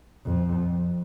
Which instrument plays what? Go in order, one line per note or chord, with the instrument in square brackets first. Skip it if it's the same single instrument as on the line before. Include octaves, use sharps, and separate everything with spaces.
[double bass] F2